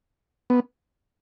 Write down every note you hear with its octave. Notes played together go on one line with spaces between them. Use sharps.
B3